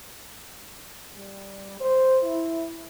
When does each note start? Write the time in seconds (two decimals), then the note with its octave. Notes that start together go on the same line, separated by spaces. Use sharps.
1.17 G3
1.80 C5
2.23 E4